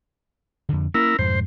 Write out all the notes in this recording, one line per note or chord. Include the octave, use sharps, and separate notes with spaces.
F2 D3
A#3 C#4 E4 A#4
F2 G#2 B2 C5